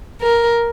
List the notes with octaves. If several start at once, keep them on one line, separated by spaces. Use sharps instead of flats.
A#4